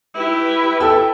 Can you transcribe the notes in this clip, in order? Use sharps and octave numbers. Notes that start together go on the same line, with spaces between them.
E4 G4 B4
A4 G5 E6